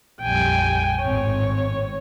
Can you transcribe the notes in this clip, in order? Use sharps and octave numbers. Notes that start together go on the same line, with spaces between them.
A#1 F2 G3 G5 G#5
G#1 A2 C4 C#5